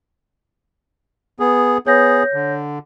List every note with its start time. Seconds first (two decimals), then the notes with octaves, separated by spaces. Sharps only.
1.40 B3 G#4
1.87 B3 G#4 C#5 G6 A#6
2.34 D3